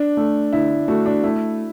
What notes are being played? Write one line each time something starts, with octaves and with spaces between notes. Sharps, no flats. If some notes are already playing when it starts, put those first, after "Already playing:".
Already playing: D4
A3
D3 E4
A3 F#4
D4
A3 E4